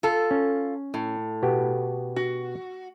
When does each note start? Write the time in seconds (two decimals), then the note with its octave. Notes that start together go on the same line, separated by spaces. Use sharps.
0.03 F4 A4
0.31 C#4
0.94 A2
1.43 B2 B3 G4
2.16 F#4